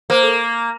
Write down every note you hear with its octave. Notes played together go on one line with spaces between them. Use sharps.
A#3 C5
A4
A#4